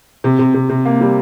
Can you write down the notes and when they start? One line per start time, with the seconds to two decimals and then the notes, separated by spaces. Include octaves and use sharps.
0.24 C3
0.39 C3
0.54 C3
0.69 C3
0.85 A#3
1.01 G3